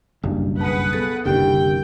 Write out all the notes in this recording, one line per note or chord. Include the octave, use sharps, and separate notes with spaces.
F#1 B1 G2
G#4 B4 F#5 A5
B3 A4 A6
F#1 C2 D3 D#4 G4 A#4 G5